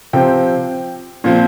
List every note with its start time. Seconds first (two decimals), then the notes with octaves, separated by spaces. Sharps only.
0.13 C3 F3 C4 G5
1.24 A#2 F3 C4